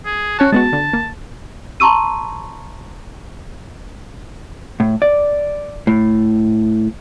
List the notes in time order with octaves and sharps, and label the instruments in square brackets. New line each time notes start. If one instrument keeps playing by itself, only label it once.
[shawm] G#4
[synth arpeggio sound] C#4 C#5 A5 [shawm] F#4
[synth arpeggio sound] G#3 B3 F#4 [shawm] A5
[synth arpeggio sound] D3
A#3
[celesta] A5 A#5 C6 C#6 E6 D#7
[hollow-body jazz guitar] A2
D5
A2